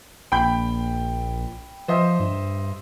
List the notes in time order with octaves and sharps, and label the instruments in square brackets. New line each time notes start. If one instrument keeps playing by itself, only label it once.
[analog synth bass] A#1 [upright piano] G5 B5 G6
[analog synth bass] F3 [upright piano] C5 D#5 E5
[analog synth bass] G2